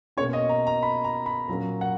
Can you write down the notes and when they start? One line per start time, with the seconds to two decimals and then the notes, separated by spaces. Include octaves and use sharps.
0.17 B2 A#3 C#4 C#5
0.33 D#5
0.49 A#5
0.67 A#5
0.83 B5
1.04 A#5
1.26 B5
1.48 A#2 F#3 A#3 C#4 A#5
1.81 F#5